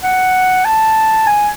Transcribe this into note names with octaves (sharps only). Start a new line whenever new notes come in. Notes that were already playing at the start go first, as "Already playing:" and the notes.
F#5
A5
G#5